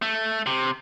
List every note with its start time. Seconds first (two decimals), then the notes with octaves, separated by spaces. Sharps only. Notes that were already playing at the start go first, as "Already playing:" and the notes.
0.02 A3
0.46 C3